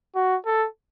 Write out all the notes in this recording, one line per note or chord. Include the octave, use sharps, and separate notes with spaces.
F#4
A4